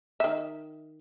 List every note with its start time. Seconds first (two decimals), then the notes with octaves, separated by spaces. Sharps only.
0.20 D#3 E5